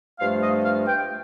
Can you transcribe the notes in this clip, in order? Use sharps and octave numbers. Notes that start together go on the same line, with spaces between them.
G2 F3 A3 F5
D#5
F5
G5